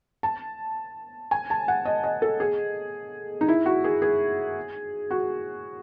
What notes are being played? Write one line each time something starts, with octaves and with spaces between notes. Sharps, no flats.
A5
G#5
A5
F#5
D#5
D#5
A4
G#4
D#4
E4
F#4
G#4
G#4
F#4